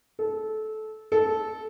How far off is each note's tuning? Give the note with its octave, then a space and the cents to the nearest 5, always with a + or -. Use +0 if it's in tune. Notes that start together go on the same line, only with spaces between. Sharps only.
A4 -20
A4 -15